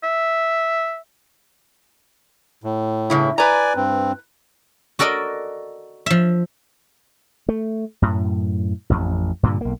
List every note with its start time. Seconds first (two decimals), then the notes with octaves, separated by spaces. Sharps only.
0.03 E5
2.64 A2
3.10 G2 C#3 E4
3.38 B4 D5 G#5 A#5
3.76 G2 C4
4.99 F#4 A4 A#4 D5 D#5
6.06 F3 E5
7.49 A3
8.02 F#2 A2
8.90 A1 F2
9.43 G2 A#2 D3
9.61 B1 A#3